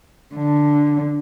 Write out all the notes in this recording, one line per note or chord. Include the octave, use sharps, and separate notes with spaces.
D3